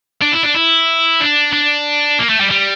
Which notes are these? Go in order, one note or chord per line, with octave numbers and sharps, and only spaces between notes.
D4
E4
D4
E4
D4
D4
A#3
A3
G3
G3